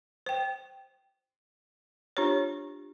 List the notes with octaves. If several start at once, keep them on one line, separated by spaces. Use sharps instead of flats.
C5 G5
D4 F4 G4 C5 C#5